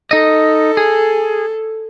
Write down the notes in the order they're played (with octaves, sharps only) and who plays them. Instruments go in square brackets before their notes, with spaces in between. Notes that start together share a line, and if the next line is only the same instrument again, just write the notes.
[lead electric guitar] D#4 D#5 [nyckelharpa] A4
[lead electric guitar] G#4